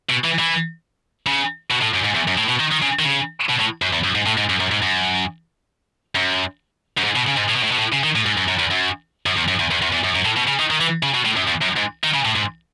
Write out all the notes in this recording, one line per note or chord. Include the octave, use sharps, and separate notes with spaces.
B2
E3
E3
C#3
B2
A2
F#2
G#2
E2
F#2
A2
B2
D#3
D#3
C#3
D#3
C#3
B2
A2
F#2
E2
F#2
G#2
A2
G#2
F#2
F#2
G#2
F#2
F#2
F#2
G#2
B2
C#3
G#2
A2
B2
A2
B2
A2
C#3
D#3
A2
G#2
F#2
F#2
E2
F#2
F#2
E2
F#2
E2
E2
E2
E2
F#2
F#2
A2
B2
C#3
D#3
D#3
E3
C#3
B2
A2
F#2
E2
F#2
G#2
D#3
C#3
A2
G#2